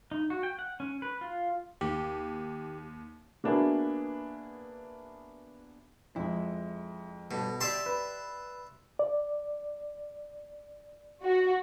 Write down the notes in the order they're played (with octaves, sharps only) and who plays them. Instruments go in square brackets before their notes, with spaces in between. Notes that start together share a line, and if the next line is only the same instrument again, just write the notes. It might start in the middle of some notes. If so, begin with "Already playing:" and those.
[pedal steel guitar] D#4
F#4
G5
F#5
C#4
B4
F4
[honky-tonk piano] D#2 [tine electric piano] G4
[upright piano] A#3 B3 D4 E4 F#4 G#4
[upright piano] F2 G#3 [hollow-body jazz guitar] E4
[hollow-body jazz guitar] G2 G3 A4 [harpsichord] B2
[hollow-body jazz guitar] G4 D5 [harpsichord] E5 A5 C6
[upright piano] B4
[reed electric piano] D5
[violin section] F#4